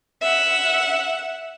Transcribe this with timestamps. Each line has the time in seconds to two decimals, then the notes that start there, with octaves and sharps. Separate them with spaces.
0.22 E5 F#5